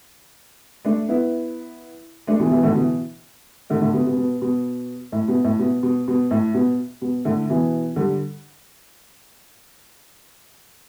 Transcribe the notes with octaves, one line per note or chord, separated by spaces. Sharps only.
A3 D4
B3 E4
A3 D4
B2 E3
B2 E3
A2 D3
B2 E3
A2 D3
A2 D3
B2
B2
B2
B2
A2
B2
A2
B2
B2
B2
A2
B2
B2
A2 D3
B2 E3
D3 G3